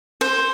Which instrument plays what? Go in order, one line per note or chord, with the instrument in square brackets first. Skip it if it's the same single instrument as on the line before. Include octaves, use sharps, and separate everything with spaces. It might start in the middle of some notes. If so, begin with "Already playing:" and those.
[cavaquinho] C5